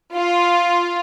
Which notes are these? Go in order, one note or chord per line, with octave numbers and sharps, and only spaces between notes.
F4